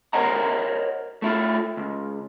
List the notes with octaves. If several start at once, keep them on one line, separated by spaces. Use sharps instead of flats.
A#4 C5 C#5 D#5 F#5 A#5
A3 E4 F4 A4
C#2